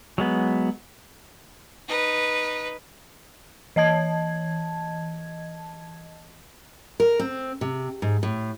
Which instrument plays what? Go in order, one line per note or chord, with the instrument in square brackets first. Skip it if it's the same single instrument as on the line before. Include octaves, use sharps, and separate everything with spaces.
[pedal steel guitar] F#3 G#3 B3
[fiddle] D#4 B4
[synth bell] E3 D#5 A5 G#6
[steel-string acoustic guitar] A#4
C4
C3
G#2
A2